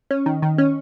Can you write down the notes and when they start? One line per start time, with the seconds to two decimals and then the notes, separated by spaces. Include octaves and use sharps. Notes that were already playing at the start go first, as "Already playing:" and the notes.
0.11 C#4
0.26 D#3
0.42 D#3
0.58 C#4